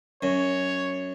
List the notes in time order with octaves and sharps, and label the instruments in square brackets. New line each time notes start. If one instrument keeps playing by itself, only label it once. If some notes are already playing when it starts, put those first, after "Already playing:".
[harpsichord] F#2 [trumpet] C#5